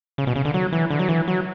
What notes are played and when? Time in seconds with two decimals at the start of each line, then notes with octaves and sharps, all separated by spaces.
0.18 C#3
0.27 B2
0.36 C#3
0.45 D3
0.54 F#3
0.73 E3
0.90 D3
0.99 F#3
1.09 E3
1.28 F#3